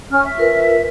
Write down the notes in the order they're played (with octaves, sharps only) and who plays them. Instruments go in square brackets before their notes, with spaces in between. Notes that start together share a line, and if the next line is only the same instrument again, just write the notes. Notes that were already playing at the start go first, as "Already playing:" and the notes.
[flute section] C#4 F6
E5
[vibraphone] F4 A#4 B4